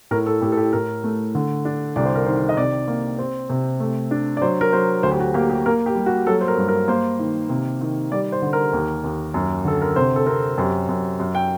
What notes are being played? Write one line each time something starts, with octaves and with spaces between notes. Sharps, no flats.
A2 A#4
A4
A2 G4
A4
G4
A2 A#4
A3
D3
D4
C2 D5
C5
A#4
D#3 C5
D#5
C3 D5
A#3
C4
C3
A3
D4
D5
F#3 C5
A#4
F#3 C5
D2 C5
G4
F#4
A#3 G4
G4
A#3 A#4
G4
G3
F#4
F#3 A4
C5
A#4
G2
A#4
A#3 C5
D#3
C3
D#3
G3 D5
C5
D3
A#4
D#2
D#2
F#2
D3 A4
A#4
C3 C5
A4
C4 A#4
F#2 G4
F#2
F#2
G5